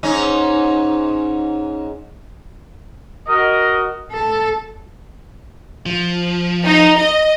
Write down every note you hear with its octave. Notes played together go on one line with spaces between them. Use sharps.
G#2 C#4 D#4
F#4 A#4 D#5
A4
F3
D#4
D#5